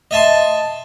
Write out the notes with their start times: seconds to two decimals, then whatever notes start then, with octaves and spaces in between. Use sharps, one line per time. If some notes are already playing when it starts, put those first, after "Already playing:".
0.11 D#5 E5 A5 C6